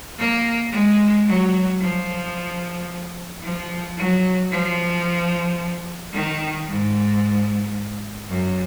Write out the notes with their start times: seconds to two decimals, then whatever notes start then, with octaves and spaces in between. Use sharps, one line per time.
0.18 A#3
0.72 G#3
1.27 F#3
1.81 F3
3.42 F3
3.97 F#3
4.51 F3
6.13 D#3
6.67 G#2
8.29 F#2